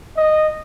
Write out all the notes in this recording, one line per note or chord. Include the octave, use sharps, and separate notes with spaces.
D#5